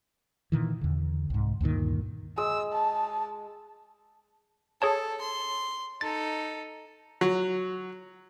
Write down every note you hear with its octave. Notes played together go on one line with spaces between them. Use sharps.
A#2 D#3 E3
E2 D3
C2 G#2
D2 G2 A#2 D#3
G#3 E6
A5
G#4 A4 C#5 A5
C6
D#4 A4 A6
F#3